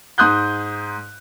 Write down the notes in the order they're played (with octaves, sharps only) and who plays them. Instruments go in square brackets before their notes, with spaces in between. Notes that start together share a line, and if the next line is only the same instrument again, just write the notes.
[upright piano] G#2 C6 D#6 F#6 G6